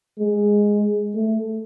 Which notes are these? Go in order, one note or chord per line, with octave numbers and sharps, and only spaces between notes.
G#3
A3